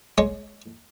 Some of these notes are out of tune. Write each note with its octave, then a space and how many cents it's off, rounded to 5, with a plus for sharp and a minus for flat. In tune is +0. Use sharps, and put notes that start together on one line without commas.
G#3 +15 C#5 +0